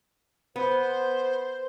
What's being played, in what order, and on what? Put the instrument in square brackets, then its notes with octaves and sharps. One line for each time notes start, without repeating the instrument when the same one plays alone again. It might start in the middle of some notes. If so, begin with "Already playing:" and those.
[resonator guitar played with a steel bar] B3 [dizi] C5